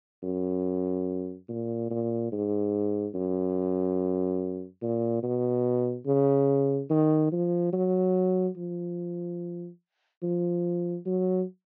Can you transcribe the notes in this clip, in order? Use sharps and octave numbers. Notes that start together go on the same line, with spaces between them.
F#2
A#2
A#2
G#2
F#2
A#2
B2
C#3
D#3
F3
F#3
F3
F3
F#3